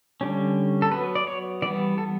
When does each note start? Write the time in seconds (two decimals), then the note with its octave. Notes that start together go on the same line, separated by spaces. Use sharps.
0.21 D3 G3 C#4
0.82 A4
0.91 F#3 B3 B4
1.15 D5
1.27 C#5
1.62 E3 G3 B3 D5
1.98 A4